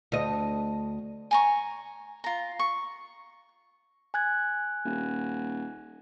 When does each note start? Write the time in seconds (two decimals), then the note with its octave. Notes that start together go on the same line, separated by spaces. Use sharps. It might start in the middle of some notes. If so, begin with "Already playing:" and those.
0.12 D2 D#5
1.31 G#5 A#5 C#6
2.24 F4 A#5
2.59 C#6
4.14 G#5 F#6 G#6
4.85 D#1